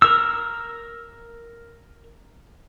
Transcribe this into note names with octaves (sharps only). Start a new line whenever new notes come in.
A#4 E6